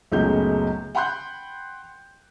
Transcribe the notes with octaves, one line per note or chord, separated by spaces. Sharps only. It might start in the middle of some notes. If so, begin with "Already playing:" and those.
F#1 C#2 G#3 A3 B3 G6
F#5 G5 B5 C6 F#6 G6